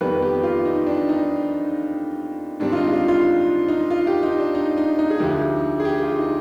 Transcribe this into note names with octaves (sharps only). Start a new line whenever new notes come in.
F2 D#3 G3 B3 B4
G4
F4
D#4
D4
D#4
G#2 D#3 G3 C4 D4
F4
D#4
F4
F4
D#4
F4
G4
D#4
D4
D#4
D#4
D#4
G#4
D2 D3 F3 G4
G#4
G4
F4
D#4